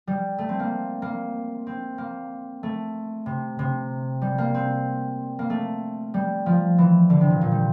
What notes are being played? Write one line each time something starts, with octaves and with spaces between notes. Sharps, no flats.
G3
A3
C4
A#3
A#3
C4
A#3
A3
C3
C3
G3
A#3
C4
A#3
A3
G3
F3
E3
D3
C3
A#2
A#2
G3